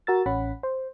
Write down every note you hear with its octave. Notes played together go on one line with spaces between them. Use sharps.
F#4 A#4 E6 A6
A1 C#4 F#5 B5
C5